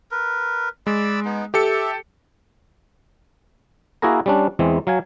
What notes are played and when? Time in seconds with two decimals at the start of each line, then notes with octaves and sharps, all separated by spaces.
0.11 A#4 B4
0.87 G#3 D5 B5 E6
1.25 B3 D#4
1.54 G4 A4 E5 C#7
4.02 A#3 E4 F#4 G#4 A#4 A#5
4.26 G3 C#4 D4
4.59 E2 E3 G#3 C4
4.87 F#3 F5 G#5